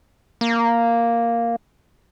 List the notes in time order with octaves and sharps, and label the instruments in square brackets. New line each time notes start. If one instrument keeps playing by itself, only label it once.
[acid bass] A#3